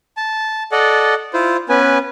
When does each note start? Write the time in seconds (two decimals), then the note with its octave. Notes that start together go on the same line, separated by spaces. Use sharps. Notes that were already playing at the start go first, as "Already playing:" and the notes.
0.17 A5
0.72 A4 D5 D#5 F#5
1.34 E4 F4 C5
1.69 B3 C#4 B4 G#5